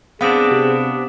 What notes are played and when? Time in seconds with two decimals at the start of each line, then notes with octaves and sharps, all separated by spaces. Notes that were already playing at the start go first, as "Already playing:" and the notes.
0.21 B3 C4 D4 G#4 F5 F#5 D#6
0.51 C3